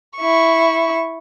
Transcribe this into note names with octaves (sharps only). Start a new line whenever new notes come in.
E4 C#6